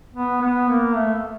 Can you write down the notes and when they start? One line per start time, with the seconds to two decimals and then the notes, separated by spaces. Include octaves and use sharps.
0.15 B3
0.42 B3
0.69 A#3
0.96 A3